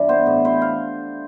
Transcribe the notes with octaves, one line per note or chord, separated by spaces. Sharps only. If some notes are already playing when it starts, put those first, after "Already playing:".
Already playing: G2 E3 D4
B3 C5
A2
E4 C5
F5